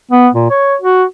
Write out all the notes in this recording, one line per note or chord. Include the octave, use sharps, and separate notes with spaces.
B3
A#2
C#5
F#4